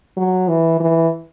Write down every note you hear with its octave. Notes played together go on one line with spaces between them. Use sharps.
F#3
E3
E3